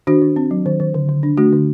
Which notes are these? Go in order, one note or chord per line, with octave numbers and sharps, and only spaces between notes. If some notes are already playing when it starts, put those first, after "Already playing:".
D#3 D4 F#4
D#3
C4
F#3
D#3
D#3
D3
D3
D4
A3 D4 F#4
D3